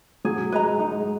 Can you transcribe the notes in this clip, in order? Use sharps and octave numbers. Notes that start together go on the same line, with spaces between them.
F#3 G#4
G#3 B4 D#5 A#5
G#3 D#4